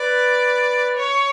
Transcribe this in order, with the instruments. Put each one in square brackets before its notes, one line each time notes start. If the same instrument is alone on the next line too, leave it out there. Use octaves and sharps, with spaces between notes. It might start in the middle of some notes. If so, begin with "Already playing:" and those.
Already playing: [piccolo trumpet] B4 [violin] D5
[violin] C#5